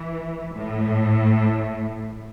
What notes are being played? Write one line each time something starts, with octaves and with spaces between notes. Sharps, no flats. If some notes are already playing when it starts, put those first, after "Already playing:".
Already playing: E3
A2